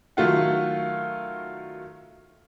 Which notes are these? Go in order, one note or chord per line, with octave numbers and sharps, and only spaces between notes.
D#3 F#3 A3 F4 F#5